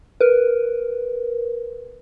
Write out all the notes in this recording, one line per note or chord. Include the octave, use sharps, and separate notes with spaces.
A#4 B4